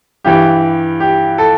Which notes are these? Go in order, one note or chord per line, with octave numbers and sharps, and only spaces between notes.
G2 E3 G4
G4
A4